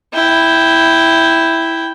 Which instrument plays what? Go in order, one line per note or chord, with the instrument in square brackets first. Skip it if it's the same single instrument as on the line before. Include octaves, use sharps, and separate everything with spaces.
[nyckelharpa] E4 G5